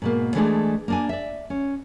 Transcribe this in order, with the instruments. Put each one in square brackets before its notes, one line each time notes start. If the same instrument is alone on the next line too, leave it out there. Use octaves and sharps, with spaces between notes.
[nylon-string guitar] G#2 B2 A#3
E3 G#3 A3 B3 D4 G#4
A#3 D4 G#5
D5 E5
C#4